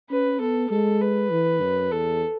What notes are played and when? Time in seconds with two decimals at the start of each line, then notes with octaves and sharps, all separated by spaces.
0.10 C#4 B4
0.41 B3 A4
0.70 G#3 A4
1.01 B4
1.31 E3
1.61 F#2
1.92 E2 A4